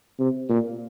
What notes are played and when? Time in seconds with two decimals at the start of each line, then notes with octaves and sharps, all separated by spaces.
0.19 C3
0.49 A#2